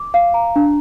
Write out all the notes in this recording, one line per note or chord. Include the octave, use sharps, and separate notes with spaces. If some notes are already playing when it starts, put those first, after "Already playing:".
Already playing: D6
F5
A#5
D4